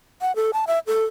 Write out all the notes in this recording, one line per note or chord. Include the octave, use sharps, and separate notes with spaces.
F#5
A4
A5
E5
A4